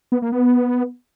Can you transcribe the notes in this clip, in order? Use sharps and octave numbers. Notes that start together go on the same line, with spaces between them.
B3
A#3
B3